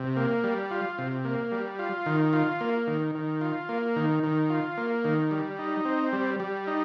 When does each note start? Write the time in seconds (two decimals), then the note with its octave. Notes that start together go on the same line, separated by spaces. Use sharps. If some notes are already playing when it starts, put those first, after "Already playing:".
Already playing: C3
0.16 A#3
0.44 G3
0.71 F4
0.98 C3
1.25 A#3
1.52 G3
1.79 F4
2.06 D#3
2.33 F4
2.61 A#3
2.87 D#3
3.15 D#3
3.41 F4
3.69 A#3
3.96 D#3
4.23 D#3
4.50 F4
4.77 A#3
5.04 D#3
5.31 G3
5.59 D#4
5.85 C4
6.13 G3
6.40 G3
6.67 D#4